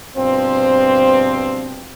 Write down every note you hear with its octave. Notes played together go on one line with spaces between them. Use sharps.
G2 B2 F3 C4